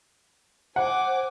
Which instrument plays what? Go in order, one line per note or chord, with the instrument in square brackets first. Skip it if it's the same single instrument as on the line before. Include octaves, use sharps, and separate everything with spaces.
[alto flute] C5 [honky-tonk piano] F#5 [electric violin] G#5 D6